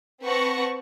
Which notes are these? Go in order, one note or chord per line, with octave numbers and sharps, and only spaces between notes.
C4 B4 F#5 A5 C#6 A#6